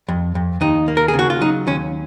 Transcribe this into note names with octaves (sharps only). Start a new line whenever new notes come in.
F2
F2
D#2 D#4
A#3
A#4
G#4
C#3
F#4
F4
F#3 D#4
D#2 C#4